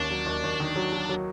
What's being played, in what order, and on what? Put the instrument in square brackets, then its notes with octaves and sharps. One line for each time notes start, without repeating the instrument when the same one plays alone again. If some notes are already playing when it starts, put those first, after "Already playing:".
Already playing: [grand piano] D#2 C#4 [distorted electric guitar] D4
[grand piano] F#3
D#2
D#2
D#3
F#3
F#3
F#3